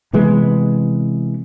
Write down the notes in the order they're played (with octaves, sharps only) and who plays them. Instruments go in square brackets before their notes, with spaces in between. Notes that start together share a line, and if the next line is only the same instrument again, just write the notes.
[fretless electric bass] C3 E3 G#3 B3